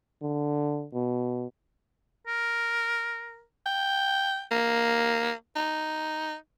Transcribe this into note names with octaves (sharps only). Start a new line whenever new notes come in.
D3
B2
A#4
G5
A#3
D#4